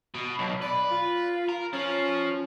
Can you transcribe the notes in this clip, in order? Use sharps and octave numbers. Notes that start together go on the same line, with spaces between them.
B2
B1
B4 D5
F4
A#4
F3 C#4